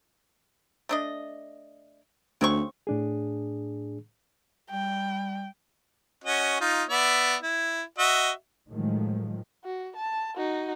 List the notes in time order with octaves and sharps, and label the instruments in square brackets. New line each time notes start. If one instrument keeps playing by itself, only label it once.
[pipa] A3 D4 D#5
[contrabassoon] D2 [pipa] C#3 C4 C#6
[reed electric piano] A2 D4 G#4
[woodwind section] G3 [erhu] G5
[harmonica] C#4 F#4 D#5
D#4 F4
B3 D5 E5
E4
F#4 D#5 E5
[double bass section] A2 D#3 F3 F#3 G#3 A3
[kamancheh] F#4
A5
D#4 F#4